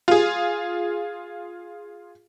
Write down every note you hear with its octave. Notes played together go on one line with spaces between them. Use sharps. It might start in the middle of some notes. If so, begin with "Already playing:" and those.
F4 G#4